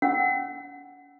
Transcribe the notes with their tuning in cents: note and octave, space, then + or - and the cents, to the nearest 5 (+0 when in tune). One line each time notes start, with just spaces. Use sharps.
C#4 +45 F#5 +0 E6 -5